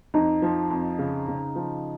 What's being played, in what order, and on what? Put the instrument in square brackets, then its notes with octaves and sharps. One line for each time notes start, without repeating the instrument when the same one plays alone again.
[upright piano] F2 [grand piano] D#4
[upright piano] F3
F2
C#3
C#3
F3